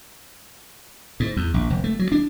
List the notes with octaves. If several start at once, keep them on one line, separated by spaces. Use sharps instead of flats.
G#2
E2
A#1
F1
A3
F#3
D4